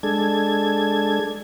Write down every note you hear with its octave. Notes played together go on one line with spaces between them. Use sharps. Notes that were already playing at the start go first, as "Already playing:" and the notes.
G#3 D4 A4 G#6